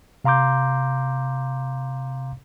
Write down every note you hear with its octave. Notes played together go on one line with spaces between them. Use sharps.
C3 F5 A#5 C6 D6 G6